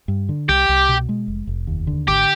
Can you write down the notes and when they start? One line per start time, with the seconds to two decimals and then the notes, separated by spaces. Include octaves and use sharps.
0.08 G2
0.29 D3
0.49 C2 G4
0.69 C2
0.89 B2
1.09 G#3
1.28 F1
1.47 F1
1.67 D#2
1.87 D3
2.08 G#1 G4